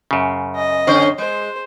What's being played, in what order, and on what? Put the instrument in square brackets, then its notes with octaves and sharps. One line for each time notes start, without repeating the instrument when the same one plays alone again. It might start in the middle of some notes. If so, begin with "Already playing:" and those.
[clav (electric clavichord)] F#2 C#3
[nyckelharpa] D#5
[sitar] D3 C#4 C5
[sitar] G#3 [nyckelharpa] C5